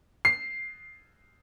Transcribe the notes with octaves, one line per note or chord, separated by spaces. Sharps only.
C7